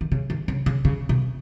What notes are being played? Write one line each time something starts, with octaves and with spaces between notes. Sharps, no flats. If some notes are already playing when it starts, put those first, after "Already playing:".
D#3
C#3
D#3
C#3
C#3
C#3
B2